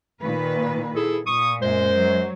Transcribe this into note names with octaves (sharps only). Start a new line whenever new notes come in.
A#2 D#3 B4
E4 G#4 A4
A#2 C#6 D#6
F#2 G#3 C5
F#3